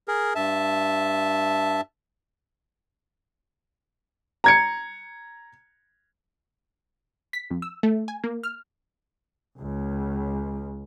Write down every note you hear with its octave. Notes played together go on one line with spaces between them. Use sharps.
G#4 A#4
G2 E5 A5
A#5 G#6 C#7
B6
F2
E6
A3
G#5
A#3
F6
C#2